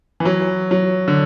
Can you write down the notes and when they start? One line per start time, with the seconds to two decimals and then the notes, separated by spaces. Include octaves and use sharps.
0.20 E3
0.25 F#3
0.71 F#3
1.08 D3